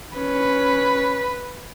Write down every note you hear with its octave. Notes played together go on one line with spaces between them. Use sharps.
C#4 B4